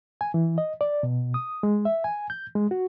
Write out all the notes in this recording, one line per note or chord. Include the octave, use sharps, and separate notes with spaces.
G#5
E3
D#5
D5
B2
D#6
G#3
E5
G#5
G6
G#3
F#4